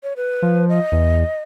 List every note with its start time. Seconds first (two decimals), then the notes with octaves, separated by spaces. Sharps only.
0.03 C#5
0.17 B4
0.42 F3
0.69 D#5
0.92 E2